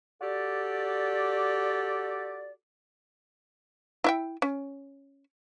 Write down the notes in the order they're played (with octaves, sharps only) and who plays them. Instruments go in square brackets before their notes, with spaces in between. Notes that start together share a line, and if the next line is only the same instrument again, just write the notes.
[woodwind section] F#4 G4 A4 D5
[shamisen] E4 E5 G5
C#4